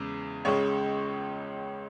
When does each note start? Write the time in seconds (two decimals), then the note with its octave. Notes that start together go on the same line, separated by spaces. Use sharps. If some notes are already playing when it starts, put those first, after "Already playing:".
Already playing: E2 C#3 G#3
0.45 C#2 C#3 G#3 C#5